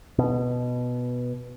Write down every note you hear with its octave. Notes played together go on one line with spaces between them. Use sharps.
B2